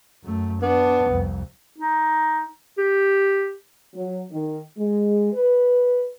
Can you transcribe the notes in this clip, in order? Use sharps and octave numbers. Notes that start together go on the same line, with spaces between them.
F#2 A3
B3 D4
C2 F2
D#4
G4
F#3
D#3
G#3
B4